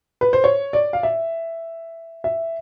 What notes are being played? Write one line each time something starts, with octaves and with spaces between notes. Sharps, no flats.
B4
C5
C#5
D5
F5
E5
E5